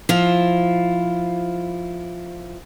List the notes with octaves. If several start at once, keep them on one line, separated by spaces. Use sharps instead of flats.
F3 E4 F4